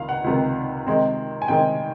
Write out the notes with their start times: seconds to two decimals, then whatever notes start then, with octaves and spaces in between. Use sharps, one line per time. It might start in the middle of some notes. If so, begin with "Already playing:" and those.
Already playing: C#2 C3 D#3 F5
0.09 F#5
0.24 C#2 C3 D#3
0.87 C3 D#3 G#3 C4
1.42 G#5
1.48 C3 D#3 G#3 C4 G5